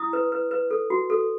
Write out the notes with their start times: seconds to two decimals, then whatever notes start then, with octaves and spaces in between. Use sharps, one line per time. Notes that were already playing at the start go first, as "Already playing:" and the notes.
Already playing: E4 D#6
0.13 B4
0.32 B4
0.51 B4
0.71 A4
0.90 F#4
1.10 A4